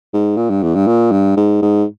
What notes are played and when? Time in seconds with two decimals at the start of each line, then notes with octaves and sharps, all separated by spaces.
0.13 G#2
0.37 A#2
0.50 G2
0.63 E2
0.75 G2
0.87 A#2
1.12 G2
1.37 G#2
1.62 G#2